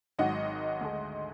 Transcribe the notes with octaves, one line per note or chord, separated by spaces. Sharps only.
G#1 G#2 D#3 F#3 D#5 F#5
D2 D3 G#3